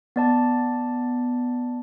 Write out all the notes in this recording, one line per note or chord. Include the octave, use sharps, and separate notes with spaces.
B3 D5 A5